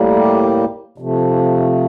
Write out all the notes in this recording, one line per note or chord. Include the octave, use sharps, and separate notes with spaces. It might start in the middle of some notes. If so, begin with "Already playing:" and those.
Already playing: A2 G3 A#3
G4
C3 F3 A3